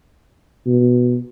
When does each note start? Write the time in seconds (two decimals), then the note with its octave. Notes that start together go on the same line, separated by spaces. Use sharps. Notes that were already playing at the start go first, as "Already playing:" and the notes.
0.67 B2